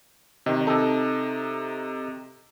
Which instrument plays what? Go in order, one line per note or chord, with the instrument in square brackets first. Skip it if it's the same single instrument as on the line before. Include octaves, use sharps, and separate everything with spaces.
[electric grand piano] C3 D#3 [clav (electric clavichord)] D#5
[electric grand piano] C3 D#4 [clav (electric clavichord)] A4